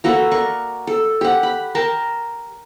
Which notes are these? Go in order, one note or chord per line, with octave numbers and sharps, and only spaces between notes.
A#3 F#4 A4 B4
A#4 D5 C#6
A4
G4 F#5
B5
A#4 G5 A5